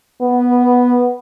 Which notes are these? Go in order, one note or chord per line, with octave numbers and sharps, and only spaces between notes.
B3